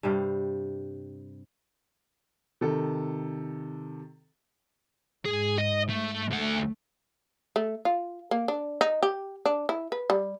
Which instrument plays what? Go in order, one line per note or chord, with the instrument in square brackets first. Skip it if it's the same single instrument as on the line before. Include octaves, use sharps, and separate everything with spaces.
[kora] G2 C3 G3 F5
[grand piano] C3 D#3 A4
[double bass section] G#2 [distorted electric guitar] G#4
[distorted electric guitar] D#5
A3
[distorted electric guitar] D2 F#5 [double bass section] A3
[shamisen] A3
F4
A#3
D4
D#4
G4
D4
E4
B4
G3